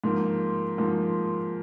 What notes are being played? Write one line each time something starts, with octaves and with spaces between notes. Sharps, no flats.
G#2 F3 A#3
G#2 F3 A#3